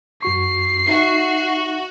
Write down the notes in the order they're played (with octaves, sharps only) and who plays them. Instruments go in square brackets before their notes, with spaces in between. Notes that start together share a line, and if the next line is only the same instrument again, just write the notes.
[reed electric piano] F#2 F#4 C#6 [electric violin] C7
[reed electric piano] D#4 E5 [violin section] F#4